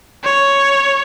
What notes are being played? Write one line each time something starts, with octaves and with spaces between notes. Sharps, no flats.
C#5